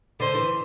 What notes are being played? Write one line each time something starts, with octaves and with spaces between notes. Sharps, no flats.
D3 C5
E3